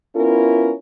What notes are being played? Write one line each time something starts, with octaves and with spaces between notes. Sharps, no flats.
B3 C#4 E4 F4 A#4